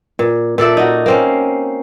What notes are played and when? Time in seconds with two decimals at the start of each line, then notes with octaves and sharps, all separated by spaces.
0.19 A#2
0.58 A#2 A4 D5 E5
0.77 D#4 F#4
1.06 A#3 C4 C#4